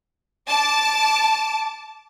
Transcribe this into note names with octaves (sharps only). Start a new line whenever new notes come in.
A5 D6